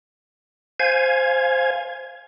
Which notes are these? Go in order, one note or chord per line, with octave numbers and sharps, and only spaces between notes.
C5 F5 G#5 G#6